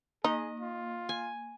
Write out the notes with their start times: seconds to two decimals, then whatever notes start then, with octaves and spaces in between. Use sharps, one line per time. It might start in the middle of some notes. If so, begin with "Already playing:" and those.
0.24 A#3 D#4 G#4 D#5
0.60 F4
1.09 G#5